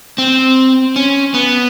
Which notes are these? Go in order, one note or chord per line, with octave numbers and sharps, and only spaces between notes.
C4
C#4
B3